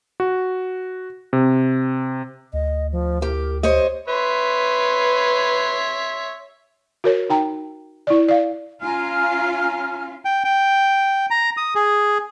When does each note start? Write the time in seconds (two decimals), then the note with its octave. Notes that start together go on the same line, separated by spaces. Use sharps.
0.20 F#4
1.33 C3
2.53 D2 D#5
2.92 F3
3.22 G4 A#4
3.63 G4 C5 C#5 D#5
4.08 B4 C#5 E5 C6
7.04 F#4 A#4 C#5
7.29 D#4 G5 A#5
8.07 E4 D5
8.28 D5 F5
8.82 C#4 F4 G#5 A#5 F6
10.25 G5
10.44 G5
11.30 A#5
11.57 D#6
11.75 G#4